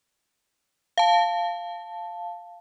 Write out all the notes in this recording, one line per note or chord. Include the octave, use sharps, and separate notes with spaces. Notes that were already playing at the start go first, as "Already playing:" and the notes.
F5 A5